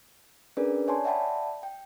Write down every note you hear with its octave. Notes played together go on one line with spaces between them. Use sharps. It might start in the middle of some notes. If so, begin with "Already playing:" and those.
C#4 D4 G#4 A#4 B4 D5
C#5 D5 G#5 A5 C6
D5 E5 F#5 G5 A5 B5
G5